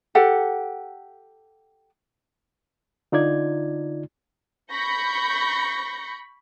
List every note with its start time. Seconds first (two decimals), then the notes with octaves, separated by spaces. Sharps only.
0.15 G4 A4 F#5
3.12 D3 D#4 F4 D5 G#6
4.72 B5 C#6 G6 A#6 C#7